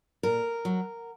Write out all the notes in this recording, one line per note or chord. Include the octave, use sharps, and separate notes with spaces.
A#2 A#4
F#3